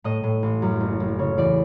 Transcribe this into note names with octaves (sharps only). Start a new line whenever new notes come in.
A2 D#5
A2
A1
F#2
F#1
F#1
C#3 C#5
E2 D5